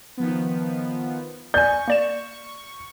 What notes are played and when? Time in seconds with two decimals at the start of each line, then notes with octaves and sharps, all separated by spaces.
0.17 D#3 F3 B3
1.54 D5 G#5 C#6 G6
1.88 A#3 D5 E7